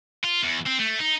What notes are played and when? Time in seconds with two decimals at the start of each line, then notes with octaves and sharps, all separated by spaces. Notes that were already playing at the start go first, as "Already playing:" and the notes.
0.24 F4
0.44 E2
0.67 C4
0.80 A3
0.99 D#4